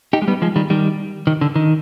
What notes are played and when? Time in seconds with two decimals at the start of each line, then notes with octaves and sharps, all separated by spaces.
0.13 D#4 G4
0.22 G#3
0.28 G3 B3
0.42 F3 G#3
0.56 D#3 G3
0.70 D#3 G3
1.27 D#3
1.41 D3
1.56 D#3